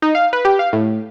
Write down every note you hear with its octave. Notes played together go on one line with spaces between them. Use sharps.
D#4
F5
B4
G4
F5
A2